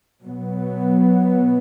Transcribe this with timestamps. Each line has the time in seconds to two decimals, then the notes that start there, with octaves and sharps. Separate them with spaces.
0.23 B2 F#3 B3